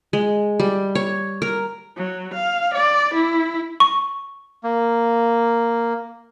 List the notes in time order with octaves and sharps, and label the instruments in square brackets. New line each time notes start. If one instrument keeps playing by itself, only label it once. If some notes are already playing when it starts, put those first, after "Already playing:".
[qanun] G#3
G3
C#5
A#4
[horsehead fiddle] F#3
F5
D5
E4
[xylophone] C#6
[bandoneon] A#3